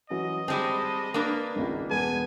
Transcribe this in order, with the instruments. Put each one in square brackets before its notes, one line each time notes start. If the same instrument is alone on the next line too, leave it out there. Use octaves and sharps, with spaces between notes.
[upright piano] E3 F#3 C#4 [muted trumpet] D#5
[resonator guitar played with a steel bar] G3 G#3 C4 [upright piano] A5
[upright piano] A5
[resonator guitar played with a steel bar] A#3 D4 B4
[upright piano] G#1 C#2
[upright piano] E1 B3 A5 [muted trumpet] G#5